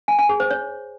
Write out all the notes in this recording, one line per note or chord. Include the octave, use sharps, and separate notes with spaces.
G#5
G#5
G#4
C5
C#5